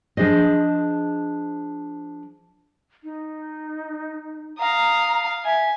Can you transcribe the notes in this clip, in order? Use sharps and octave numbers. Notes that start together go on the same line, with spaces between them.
F3 D4 G#4 C5 D#5
D#4
F5 A#5 D#6
E5 G#5